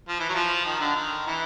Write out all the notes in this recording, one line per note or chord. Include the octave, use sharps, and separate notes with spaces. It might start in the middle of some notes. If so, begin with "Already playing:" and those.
F3
E3
F#3
F3
D#3
D3
D#3
E3